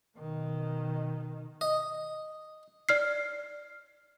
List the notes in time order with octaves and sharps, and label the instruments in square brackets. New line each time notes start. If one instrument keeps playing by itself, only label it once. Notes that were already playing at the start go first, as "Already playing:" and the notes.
[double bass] B2 D#3
[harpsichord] D#5
[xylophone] D5 F6 C7